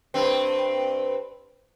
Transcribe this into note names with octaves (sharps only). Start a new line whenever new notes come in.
G2 C4